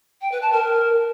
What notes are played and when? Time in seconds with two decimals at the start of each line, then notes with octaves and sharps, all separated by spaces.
0.21 G5
0.31 B4
0.42 A5
0.52 A#4